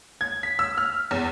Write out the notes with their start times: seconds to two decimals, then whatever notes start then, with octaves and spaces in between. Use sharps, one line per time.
0.21 G#6
0.43 B6
0.59 E6
0.78 F6
1.11 E2